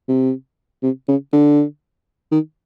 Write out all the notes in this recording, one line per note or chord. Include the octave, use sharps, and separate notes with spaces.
C3
C3
C#3
D3
D#3